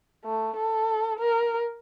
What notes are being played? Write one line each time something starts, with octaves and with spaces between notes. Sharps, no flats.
A3
A4
A#4